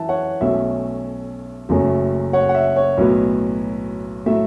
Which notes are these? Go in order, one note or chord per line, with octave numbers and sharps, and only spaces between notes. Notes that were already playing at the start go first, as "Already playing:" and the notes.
Already playing: F#2 E3 E5 A5
C#5 F#5
B1 B2 A3 C#4 E5
F#1 F#2 F#3 A3 C#4
C#5 F#5
F#5
E5
C#5
B1 A2 F#3 B3
A2 F#3 A3 E5